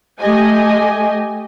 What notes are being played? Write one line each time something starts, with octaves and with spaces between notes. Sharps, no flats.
A3 G4 D#5 G#5